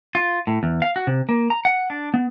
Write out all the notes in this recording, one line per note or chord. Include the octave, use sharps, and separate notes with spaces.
F4
A2
E2
F5
F#4
C3
A#3
A#5
F#5
D4
B3